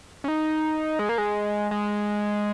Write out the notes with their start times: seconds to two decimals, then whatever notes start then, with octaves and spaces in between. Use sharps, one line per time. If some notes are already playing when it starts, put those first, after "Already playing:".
0.24 C#4
0.28 D#4
0.99 G#3
1.09 A#3
1.18 G#3
1.71 G#3